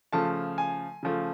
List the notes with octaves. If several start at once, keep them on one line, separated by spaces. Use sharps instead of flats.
C#3 F3 A3 A5
G#5
C#3 F3 A3